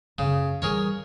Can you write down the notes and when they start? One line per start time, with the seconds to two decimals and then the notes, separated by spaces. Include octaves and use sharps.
0.18 F#2 C#3
0.62 E3 G3 G#4 A#4 C#5